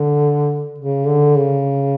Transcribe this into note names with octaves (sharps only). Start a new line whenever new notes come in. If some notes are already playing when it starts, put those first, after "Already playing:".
Already playing: D3
C#3
D3
C#3